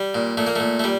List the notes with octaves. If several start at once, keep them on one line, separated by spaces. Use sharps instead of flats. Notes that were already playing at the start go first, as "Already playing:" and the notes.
Already playing: G3
A#2
A#2 A3
A#3
A#2 A3
A3
G3